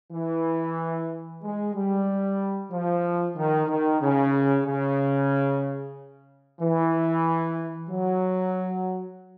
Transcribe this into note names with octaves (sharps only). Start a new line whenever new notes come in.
E3
G#3
G3
F3
D#3
D#3
C#3
C#3
E3
F#3